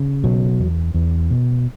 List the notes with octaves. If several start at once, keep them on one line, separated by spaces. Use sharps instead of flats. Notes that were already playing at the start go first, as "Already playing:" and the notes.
Already playing: C#3
B2 F#3
E2
E2
B2